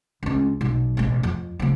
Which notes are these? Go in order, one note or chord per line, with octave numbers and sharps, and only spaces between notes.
C#2 C#4
B1 F#3
A1 B2
F2
C#3 F3